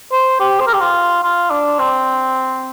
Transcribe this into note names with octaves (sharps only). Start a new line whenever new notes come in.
C5
G4
C5
A#4
G4
F4
F4
D4
C4